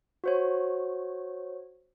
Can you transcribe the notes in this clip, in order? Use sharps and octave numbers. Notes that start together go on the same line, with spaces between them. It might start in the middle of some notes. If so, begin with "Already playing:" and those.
F#4 C5 C#5